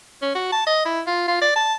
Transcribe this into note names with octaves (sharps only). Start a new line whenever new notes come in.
C#4
F#4
A5
D#5
E4
F4
F4
D5
A5